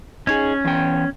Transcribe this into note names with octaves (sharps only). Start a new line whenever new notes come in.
C#4 D#4 G#4 C#5
E2 G5